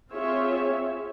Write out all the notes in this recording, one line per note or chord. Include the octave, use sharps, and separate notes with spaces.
C4 F4 G#4 C#5 E5